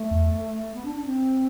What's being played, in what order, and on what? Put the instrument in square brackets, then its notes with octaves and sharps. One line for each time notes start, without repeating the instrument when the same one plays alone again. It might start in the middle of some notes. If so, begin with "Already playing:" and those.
Already playing: [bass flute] A3
[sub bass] E2
[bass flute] B3
D4
D4
C4